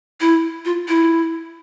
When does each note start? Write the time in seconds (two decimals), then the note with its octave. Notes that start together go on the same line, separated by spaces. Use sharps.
0.21 E4
0.65 F4
0.88 E4